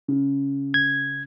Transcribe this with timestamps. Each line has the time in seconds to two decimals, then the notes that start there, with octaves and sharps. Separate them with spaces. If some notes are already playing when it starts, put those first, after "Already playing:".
0.08 C#3
0.74 G#6